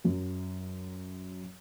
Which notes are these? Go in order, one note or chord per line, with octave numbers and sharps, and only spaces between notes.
F#2 F#3